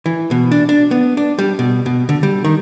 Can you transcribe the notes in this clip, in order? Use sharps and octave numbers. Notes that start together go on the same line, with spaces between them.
E3
B2
D4
D4
B3
D4
G3
B2
B2
D3
G3
D#3